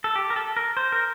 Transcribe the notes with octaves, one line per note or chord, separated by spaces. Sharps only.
A4
G4
A#4
A4
A#4
C5
A#4